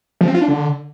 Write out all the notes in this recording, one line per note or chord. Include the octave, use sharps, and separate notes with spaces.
F3
C4
F4
D4
D3